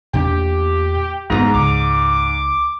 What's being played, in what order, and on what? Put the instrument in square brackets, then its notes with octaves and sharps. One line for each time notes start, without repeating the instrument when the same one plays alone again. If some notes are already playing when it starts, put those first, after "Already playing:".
[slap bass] E2 A#2 D4 [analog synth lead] G4
[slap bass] D2 G#3 B3 [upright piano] G#2 [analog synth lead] A#5
[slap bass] C#2 [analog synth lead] D6